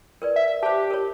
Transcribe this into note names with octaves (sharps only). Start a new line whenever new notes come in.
A#4 B4 D5
E5
G4 C5 A5
A#4 C#5